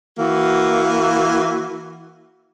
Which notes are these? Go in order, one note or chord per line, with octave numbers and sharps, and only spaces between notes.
E3 A#3 F#4